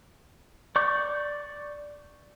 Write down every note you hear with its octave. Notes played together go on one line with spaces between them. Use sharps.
D5 C#6 D6 G6